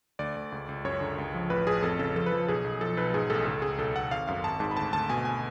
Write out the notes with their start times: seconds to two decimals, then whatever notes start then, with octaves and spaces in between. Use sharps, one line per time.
0.19 D2 D5
0.36 D2
0.52 C#2
0.69 C#2
0.85 F#2 C#5
1.01 D3
1.18 C#2
1.34 F3
1.50 A1 B4
1.67 A1 G#4
1.82 F2 A4
1.99 C#3 A4
2.16 F3 A4
2.26 B4
2.32 F3
2.48 B1 G#4
2.64 B1
2.81 F3 A4
2.97 B1 B4
3.14 G#2 G#4
3.30 A1 A4
3.46 C#2 A4
3.62 C#2 G#4
3.78 B1 A4
3.95 B1 F#5
4.11 G#1 F5
4.27 F#2 F5
4.44 G#1 A5
4.60 G#2 A5
4.71 B5
4.77 D2 A5
4.93 D2 A5
5.10 B2 G#5
5.25 G#5